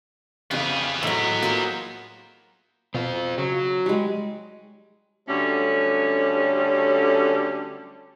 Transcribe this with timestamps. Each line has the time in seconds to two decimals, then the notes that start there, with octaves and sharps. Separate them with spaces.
0.51 F2 C#3 B3 G4 G#4 F5
1.03 G#1 A2 F#3 A#5
1.42 F#3 A#3 F4 C5 A#5
2.94 B2 C4 F4
3.38 C#3 F#3
3.86 G3 G#3
5.28 D3 F#3 G3 A3 C#4